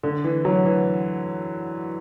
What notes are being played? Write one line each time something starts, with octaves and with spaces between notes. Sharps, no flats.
D3
E3
F#3
E3